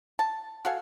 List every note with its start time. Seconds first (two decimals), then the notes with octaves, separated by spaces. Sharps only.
0.19 A5
0.65 F#4 A4 F5 G#5